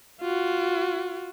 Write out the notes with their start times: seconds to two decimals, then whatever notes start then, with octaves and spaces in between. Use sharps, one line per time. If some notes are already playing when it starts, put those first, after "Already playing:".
0.21 F4 F#4